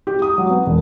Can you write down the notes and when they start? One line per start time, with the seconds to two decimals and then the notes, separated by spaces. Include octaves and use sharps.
0.07 G4
0.22 D#6
0.38 F#3
0.50 B3
0.66 E1